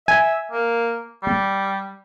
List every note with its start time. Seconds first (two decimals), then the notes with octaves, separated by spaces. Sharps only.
0.08 E5 G#5
0.51 A#3
1.23 G3